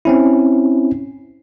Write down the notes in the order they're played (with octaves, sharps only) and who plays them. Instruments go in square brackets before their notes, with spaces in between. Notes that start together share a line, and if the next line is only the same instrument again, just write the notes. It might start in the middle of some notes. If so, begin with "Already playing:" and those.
[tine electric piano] C4 C#4 E4